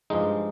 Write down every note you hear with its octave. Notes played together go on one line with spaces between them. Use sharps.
G2 F3 G#3 D#4